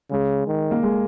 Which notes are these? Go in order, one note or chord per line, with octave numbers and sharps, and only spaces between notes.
C#3 G#3
D#3
A#3
G#3